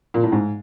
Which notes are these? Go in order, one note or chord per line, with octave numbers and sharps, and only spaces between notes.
A#2
A2
G#2